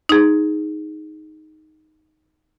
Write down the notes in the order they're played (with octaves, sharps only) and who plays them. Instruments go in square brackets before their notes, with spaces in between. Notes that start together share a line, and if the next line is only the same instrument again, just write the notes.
[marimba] D#4 G#4